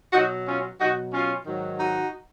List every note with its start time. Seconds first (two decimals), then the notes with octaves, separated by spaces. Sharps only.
0.13 B2 F#3 D#4 F#4
0.46 C#4 F4
0.79 B2 F#3 D#4 F#4
1.12 C#4 F4
1.46 G#2 D#3 F#3
1.78 D#4 F#4